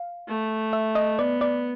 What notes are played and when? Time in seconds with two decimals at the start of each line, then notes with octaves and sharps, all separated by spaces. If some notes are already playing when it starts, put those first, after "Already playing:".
Already playing: F5
0.28 A3
0.73 E5
0.95 D#5
1.19 B3 D5
1.41 D5